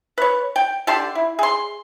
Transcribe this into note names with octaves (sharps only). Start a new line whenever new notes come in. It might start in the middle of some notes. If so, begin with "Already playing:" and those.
B4 C#5
G5
D3 G4 A5 C6
E4
G#4 C6